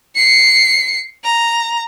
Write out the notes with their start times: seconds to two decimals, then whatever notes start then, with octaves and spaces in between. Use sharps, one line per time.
0.16 C7 C#7
1.24 A#5